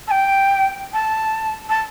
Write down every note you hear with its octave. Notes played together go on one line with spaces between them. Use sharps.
A5
G5
A5
A5